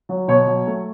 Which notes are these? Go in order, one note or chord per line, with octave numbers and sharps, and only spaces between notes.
F#3
B2 C#5
F#3
A3